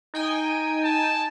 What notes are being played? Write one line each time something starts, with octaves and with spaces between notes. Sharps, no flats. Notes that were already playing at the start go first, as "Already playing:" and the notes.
D#4 G5 G#5
A5